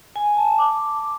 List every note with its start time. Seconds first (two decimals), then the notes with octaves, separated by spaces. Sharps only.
0.16 G#5
0.26 G#5
0.37 A5
0.48 A5
0.58 D6